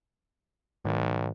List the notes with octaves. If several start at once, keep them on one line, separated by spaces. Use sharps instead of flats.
B1 G#2 D#3